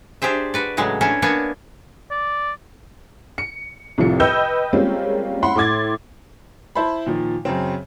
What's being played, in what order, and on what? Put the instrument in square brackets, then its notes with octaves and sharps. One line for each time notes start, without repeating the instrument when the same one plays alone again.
[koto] D4 G4 G#4 C5 E5
F#4 B4 D5
A2 C#3 F#3 G#3
C#4 D4 E4 G#5
A#3 B3 D4 C#5 G#5
[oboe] D5
[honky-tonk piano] C#7
C2 A2 C3 F3 C#7
B4 D#5 G5 E6 G6
G3 G#3 A#3 C4 C#4 F4
E4 F#5 B5 C6
A2 C6 D6 G#6 A6
[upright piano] E4 C5 A5 B5
A#2 D#3 F3
F#2 C#3 C4